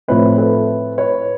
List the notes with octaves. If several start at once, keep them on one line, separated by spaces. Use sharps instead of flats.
A2 F3 A3 C4 B4 C#5
A4 B4
B4 C#5